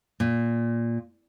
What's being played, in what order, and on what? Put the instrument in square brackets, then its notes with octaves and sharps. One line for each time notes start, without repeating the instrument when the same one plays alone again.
[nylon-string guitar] A#2